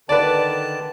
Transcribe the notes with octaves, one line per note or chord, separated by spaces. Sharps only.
D3 D#3 B4 D5 A5